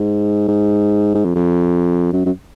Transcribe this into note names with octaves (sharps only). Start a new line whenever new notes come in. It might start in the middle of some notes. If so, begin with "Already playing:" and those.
Already playing: G#2
G#2
G#2
F2
F2
F#2
F#2